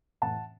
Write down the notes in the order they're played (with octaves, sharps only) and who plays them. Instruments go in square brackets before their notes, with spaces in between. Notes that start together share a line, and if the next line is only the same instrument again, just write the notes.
[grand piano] A2 E3 F#5 A5